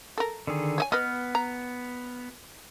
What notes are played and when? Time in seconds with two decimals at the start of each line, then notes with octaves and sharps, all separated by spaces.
0.18 A4 A#4
0.47 D3 D#3 G#4
0.78 C#5 D#5 G#5
0.92 B3 B4 D#5 F6
1.35 A#5